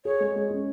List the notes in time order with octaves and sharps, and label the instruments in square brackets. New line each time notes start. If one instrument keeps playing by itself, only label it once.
[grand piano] G#4 [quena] C#5
[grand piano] G#3
G#3
C#4